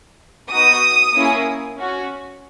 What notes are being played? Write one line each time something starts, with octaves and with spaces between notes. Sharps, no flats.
B3 D#4 F#4 D#6
A#3 C#4 E4 G#4
C#4 F#4